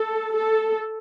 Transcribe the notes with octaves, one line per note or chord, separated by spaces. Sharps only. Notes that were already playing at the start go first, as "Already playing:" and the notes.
Already playing: A4
A4